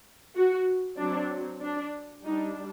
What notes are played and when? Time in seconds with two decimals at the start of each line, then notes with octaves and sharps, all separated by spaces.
0.37 F#4
0.99 F#3 C4 D4
1.62 D4
2.25 G3 D4 D#4